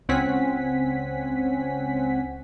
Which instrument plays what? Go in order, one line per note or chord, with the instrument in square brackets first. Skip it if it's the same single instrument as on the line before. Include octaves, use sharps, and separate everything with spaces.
[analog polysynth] C#2 C4 C#4 F#5 G#5 B6